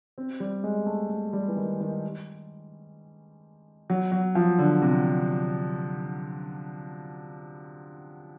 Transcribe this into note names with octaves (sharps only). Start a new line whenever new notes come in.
C4
G3
G#3
A3
A3
G3
E3
D#3
D#3
F#3
F#3
F3
D3
C3